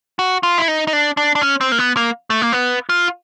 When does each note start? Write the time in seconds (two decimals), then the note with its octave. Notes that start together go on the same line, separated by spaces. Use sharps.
0.19 F#4
0.43 F4
0.58 E4
0.68 D#4
0.87 D#4
0.93 D4
1.17 D4
1.35 D4
1.42 C#4
1.61 C4
1.72 A#3
1.78 B3
1.97 A#3
2.30 A3
2.42 A#3
2.53 B3
2.89 F4